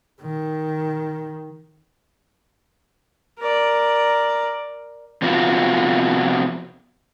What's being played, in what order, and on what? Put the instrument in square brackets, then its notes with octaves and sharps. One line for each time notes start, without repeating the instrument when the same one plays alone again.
[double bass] D#3
[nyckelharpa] A#4 D5
[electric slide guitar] C3 F3 B3 F4 F#4